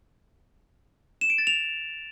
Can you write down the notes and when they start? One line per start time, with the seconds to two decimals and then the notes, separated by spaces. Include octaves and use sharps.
1.21 E7
1.30 D7
1.38 A6
1.47 F7